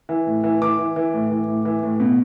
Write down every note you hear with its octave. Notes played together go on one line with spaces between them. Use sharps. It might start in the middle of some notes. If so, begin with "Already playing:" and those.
E3
A2
E3
E3 D6
E3
E3
A2
E3
A2
E3
A2
B2